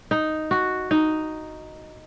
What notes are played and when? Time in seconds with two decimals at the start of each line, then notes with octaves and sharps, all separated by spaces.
0.11 D#4
0.51 F#4
0.91 D#4